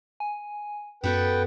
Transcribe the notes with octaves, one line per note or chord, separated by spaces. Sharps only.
G#5
F#2 B3 F#4 A4 B4 G5